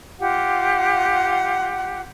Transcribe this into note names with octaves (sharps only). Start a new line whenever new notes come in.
F4 G4 F#5